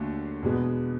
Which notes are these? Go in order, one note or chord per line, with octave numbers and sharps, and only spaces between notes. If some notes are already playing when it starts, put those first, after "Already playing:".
Already playing: D#2 D3 F#3 A3
E2 B2 G#3 B3